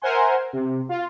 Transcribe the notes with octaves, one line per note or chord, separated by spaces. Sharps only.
A#4 C5 E5 F#5 G#5 C6
C3
F4